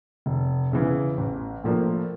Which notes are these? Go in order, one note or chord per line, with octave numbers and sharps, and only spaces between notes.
F1
E2 C#3 E3
A1
A2 F3 A#3 D4